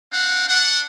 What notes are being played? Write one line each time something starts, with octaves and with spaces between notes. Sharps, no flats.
C4 D4 F5 F#5
D4 F#5